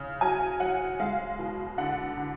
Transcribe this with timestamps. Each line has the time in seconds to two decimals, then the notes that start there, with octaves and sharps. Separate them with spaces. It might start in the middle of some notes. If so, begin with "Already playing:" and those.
Already playing: C#3
0.21 F#3 G#5
0.60 F#3 F#5
1.00 G#3 F5
1.39 B2
1.78 D3 F#5
2.17 D3